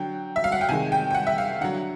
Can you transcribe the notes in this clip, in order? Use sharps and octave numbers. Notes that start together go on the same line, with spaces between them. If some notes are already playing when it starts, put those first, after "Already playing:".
Already playing: D3 F#3 G5
E5
F5
F#5
G5
C3 D#3 G#3 G#5
G5
G5
F#5
E5
F5
D3 F#3 F#5